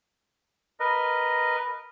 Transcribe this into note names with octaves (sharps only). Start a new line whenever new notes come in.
A#4 B4 D#5